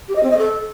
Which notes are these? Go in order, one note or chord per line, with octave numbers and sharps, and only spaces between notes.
G4
D#5
C4
D#5
A4